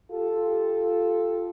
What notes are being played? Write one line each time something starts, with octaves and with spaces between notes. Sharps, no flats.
F4 G4 A4